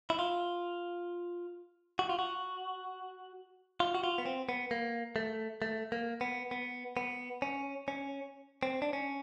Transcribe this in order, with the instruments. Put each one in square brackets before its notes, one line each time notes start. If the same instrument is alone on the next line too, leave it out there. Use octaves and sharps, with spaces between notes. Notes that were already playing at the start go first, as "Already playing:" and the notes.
[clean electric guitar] E4
F4
F#4
F4
F#4
F4
F#4
F4
B3
C4
B3
A#3
A3
A3
A#3
B3
B3
B3
C#4
C#4
C4
D4
C#4